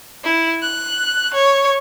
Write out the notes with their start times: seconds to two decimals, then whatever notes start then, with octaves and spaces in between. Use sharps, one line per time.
0.24 E4
0.62 F#6
1.34 C#5